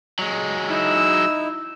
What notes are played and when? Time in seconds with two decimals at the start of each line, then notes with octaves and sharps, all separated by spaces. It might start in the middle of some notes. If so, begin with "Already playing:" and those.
0.19 F#3 G#3
0.69 D#4 E4 E6